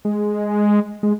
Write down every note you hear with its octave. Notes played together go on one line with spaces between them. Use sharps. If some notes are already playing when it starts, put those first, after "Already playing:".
G#3
G#3